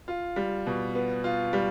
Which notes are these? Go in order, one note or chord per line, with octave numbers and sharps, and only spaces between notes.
F4
G3
B2
B3
F4
G3